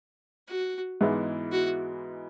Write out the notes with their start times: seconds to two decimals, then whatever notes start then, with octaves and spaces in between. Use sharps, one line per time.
0.48 F#4
1.01 G#2 E3 G#3 B3 E4
1.52 F#4